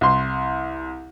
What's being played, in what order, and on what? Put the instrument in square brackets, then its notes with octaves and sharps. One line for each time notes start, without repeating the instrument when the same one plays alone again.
[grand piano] C2 C6